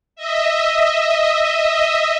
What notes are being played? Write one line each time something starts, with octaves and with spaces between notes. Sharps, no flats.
D#5 E5